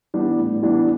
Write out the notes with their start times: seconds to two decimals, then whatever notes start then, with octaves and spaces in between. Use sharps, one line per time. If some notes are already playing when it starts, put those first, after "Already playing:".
0.14 E3 G3 B3 D4
0.39 A2
0.63 E3 G3 B3 D4